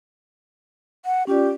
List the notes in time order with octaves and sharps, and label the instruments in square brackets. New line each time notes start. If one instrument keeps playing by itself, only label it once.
[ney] F#5
[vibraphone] C#4 F4 D5 [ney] G4